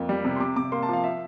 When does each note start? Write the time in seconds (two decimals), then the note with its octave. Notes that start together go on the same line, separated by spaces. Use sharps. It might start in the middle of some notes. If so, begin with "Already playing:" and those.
Already playing: F2 A#3
0.09 G3
0.25 C3
0.36 C6
0.40 C3 D6
0.56 C3 D6
0.72 A#3 C6
0.83 A5
0.89 F3 F5
1.04 E5